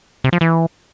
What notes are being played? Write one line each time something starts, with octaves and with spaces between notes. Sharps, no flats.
C3
F3
E3